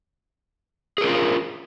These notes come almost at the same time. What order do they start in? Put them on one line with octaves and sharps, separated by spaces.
G#4 A#4 C#4 F4